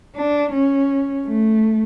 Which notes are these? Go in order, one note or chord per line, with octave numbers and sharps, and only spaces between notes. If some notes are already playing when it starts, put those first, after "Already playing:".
D4
C#4
A3